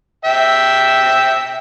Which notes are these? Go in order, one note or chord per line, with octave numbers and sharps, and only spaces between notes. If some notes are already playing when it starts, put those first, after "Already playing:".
E5 G5